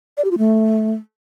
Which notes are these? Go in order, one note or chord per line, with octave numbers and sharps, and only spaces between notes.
D5
G4
F4
A3